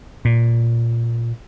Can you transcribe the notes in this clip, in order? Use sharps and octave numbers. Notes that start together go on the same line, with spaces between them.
A#2